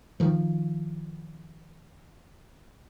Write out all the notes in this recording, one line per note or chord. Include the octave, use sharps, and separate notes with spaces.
D#3 F3